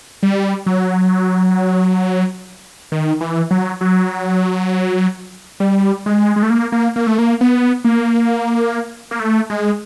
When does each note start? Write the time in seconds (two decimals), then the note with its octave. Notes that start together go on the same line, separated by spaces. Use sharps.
0.23 G3
0.66 F#3
2.92 D#3
3.21 E3
3.51 F#3
3.81 F#3
5.60 G3
6.06 G#3
6.36 G#3
6.43 A3
6.50 A#3
6.72 A#3
6.96 A#3
7.07 A3
7.18 A#3
7.41 B3
7.85 A#3
9.11 A#3
9.20 A3
9.50 G#3